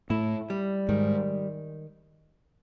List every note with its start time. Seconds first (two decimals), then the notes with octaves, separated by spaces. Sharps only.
0.10 A2 A3 E4
0.50 G3
0.89 G#2 D#3 G#3